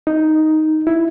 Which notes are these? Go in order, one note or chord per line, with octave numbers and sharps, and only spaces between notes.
D#4
E4